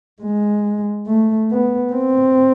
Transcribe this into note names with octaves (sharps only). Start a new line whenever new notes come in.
G#3
A3
B3
C4